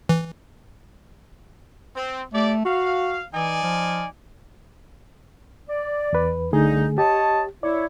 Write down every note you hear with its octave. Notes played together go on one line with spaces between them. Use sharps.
E3
C4
A3 G4 D5
F#4 F5
E3 D#4 D5 G#5
F3
D5
E2 B4
C2 D3 A3 D#4 G#4
G4 C#5 D#5 A5
E4 C#5 D5